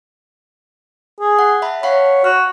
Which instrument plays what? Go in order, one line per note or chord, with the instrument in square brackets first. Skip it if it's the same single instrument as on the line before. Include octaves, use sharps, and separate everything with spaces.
[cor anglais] G#4
[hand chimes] F#5
E5 A5 B5
[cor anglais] C#5 [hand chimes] F5 F#5 B5
[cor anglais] F#4 [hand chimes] F6